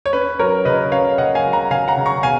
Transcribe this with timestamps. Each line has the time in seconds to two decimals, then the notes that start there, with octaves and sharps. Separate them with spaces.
0.06 C#5
0.13 C#4 B4
0.39 F#3 A#4 C#5
0.65 C#3 B4 D#5
0.92 C#4 C#5 F5
1.18 C#3 D#5 F#5
1.35 F5 G#5
1.44 F#3
1.53 F#5 A#5
1.71 C#3 F5 G#5
1.88 F#5 A#5
1.97 C#3
2.06 A#5 C#6
2.23 B2 F5 G#5